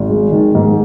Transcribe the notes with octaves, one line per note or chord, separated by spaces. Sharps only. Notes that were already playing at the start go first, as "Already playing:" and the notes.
Already playing: G#1
G#3
D#3
G#2